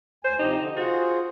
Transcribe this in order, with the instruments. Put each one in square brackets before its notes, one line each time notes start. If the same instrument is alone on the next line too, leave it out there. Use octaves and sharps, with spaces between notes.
[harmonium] D2 G#5 [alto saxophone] C5
[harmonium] C3 F3 G4 [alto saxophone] D#4
[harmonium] D3
[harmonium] F4 G#4 C5 [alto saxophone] F#4